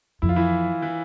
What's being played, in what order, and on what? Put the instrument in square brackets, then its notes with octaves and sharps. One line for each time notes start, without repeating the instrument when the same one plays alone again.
[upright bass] F2 [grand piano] E4
[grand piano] F4
E3 E4
E3 E4